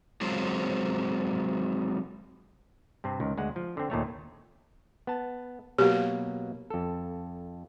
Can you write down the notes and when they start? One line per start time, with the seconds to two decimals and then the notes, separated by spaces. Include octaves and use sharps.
0.21 F#3 G#3 C4 F4 G#4
3.04 G2 C3 C4
3.20 C#2 D#3
3.38 D2 G#3 F#5
3.56 F3
3.77 D3 C4
3.90 D#2 A#2 A3 C#5
5.07 B3 A5
5.78 B2 F#3 A#3 G4
6.70 F2 A4